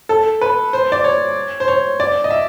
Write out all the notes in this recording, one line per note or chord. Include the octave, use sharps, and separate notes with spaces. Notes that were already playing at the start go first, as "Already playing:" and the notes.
A4
B4
C5
D5
C#5
C5
C#5
D5
D#5
E5